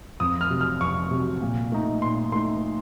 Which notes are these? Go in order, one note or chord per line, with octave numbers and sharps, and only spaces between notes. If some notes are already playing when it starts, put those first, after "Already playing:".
F2 D#6
F6
C3 F#3
F6
F2 C#6
C3 F#3
A#2
A3 D#4
A#2 C6
A3 D#4 C6